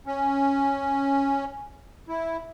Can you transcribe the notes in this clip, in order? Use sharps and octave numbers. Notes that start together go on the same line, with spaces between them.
C#4
E4